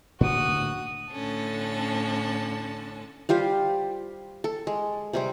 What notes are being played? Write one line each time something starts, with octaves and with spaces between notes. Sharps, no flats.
A2 D3 A#3 F#4 D#6
A2 D3 C#4 A5
G3 F4 G4 C5
A4
G#3
C3 G3 C4